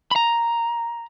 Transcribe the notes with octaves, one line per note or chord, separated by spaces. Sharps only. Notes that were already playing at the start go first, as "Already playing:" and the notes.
A#5 B5